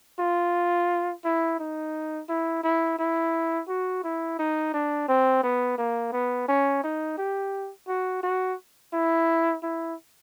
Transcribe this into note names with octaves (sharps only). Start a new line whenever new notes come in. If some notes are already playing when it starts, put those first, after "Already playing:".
F4
E4
D#4
E4
E4
E4
F#4
E4
D#4
D4
C4
B3
A#3
B3
C#4
D#4
G4
F#4
F#4
E4
E4